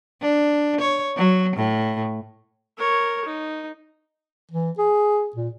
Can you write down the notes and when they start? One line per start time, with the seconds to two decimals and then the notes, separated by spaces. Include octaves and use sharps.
0.21 D4
0.81 C#5
1.17 F#3
1.56 A2
2.78 A#4 C#5
3.25 D#4
4.51 E3
4.78 G#4
5.36 A#2